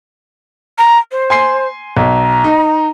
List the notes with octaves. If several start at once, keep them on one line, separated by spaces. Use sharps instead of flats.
A#5
C5
G#5 C6 C7
B1 A#5
D#4